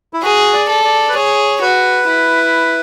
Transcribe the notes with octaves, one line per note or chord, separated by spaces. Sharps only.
E4
F#4 G#4
D5
A4
D5
B4
G#4 C#5
F#4 B4
E4